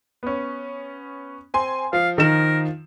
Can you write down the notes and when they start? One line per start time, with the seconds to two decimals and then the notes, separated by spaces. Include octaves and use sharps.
0.23 B3 C#4
1.54 C4 G#5 C6
1.93 F3 F5
2.18 D#3 A#4 E7